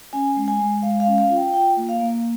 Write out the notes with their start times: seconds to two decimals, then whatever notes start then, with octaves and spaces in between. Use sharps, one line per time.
0.13 C#4 G#5
0.36 G#3
0.48 G#5
0.60 G#3
0.82 G#3 F5
1.00 F5
1.07 C#4
1.18 F5
1.30 F4
1.36 G5
1.54 F4 G5
1.77 A#3
1.89 F5
2.00 A#3